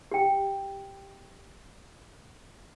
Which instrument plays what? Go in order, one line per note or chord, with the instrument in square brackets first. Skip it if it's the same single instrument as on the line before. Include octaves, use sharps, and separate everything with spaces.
[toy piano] G4 G5